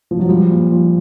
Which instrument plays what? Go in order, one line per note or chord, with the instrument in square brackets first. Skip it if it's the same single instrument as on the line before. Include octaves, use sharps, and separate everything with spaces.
[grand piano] F3
F#3
[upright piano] F3 [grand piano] G3
[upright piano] A#2
F3